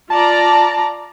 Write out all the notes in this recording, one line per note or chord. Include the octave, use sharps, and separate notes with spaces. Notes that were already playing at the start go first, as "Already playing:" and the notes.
F4 D5 A5 A#5